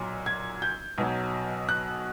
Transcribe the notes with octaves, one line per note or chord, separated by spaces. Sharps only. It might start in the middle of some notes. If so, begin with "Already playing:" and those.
Already playing: B1 A#2 F#3
G#6
G6
B1 B2 F#3
F#6